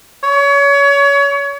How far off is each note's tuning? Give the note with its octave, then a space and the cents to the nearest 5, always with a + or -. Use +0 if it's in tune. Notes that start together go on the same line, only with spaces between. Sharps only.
C#5 +30